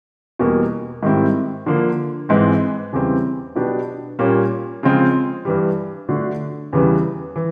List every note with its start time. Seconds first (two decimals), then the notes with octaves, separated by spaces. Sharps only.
0.39 E2 B2 G3 A#3
1.03 G#2 D#3 G3 C4 E4
1.66 D3 F3 A#3
2.29 G#2 E3 G#3 C4
2.93 E2 C#3 E3 G3 C4
3.56 B2 F#3 B3 D4 G4
4.19 A#2 G3 A#3 C#4
4.83 C#3 F3 G#3 C4 F4
5.45 G2 E3 G3
6.09 D3 F#3 A3 D4 F#4
6.73 E2 C#3 E3 G3 B3
7.36 E3